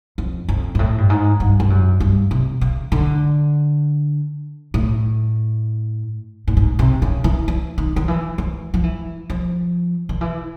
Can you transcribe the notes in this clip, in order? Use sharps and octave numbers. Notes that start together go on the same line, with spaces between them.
F2
F2
G#2
A2
G2
G#2
G2
G2
F#2
G2
C3
C#3
D3
A2
A2
G#2
C3
C#3
E3
E3
D#3
D#3
E3
E3
F3
E3
F3
D#3
E3